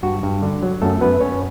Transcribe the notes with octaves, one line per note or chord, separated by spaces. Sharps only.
G2 F#4
G2
D3
F#3
F#2 A3 A4
F#2 B3 B4
F#2 C#4 C#5